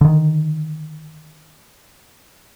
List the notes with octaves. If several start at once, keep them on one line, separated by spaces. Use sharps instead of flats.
D3 D#3